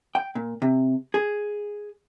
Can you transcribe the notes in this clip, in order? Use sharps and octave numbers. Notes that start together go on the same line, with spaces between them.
G5
A#2
C3
G#4